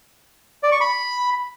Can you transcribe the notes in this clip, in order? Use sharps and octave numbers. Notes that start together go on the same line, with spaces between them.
D5
C#6
B5